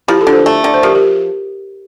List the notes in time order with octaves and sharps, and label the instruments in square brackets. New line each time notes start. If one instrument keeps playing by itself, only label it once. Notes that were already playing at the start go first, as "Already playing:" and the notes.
[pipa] F3 [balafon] E4 G4
[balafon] F4 A4
[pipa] D3
[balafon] A4 C5
[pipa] A3
D3
[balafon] C5
[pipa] F3 [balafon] G4 A#4
[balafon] G4 A#4